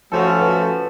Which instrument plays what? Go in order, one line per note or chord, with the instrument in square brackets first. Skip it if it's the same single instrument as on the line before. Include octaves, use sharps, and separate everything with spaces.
[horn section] F3 A3 C#4 F#4 [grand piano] A4
[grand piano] B4